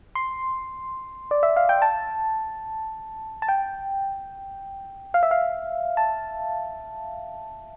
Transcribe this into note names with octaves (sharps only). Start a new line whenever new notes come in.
C6
D5
E5
F5
G5
A5
A5
G5
F5
E5
F5
A5